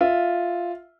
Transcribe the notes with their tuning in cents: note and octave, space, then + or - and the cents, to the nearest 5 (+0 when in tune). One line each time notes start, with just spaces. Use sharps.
F4 +0 E5 +0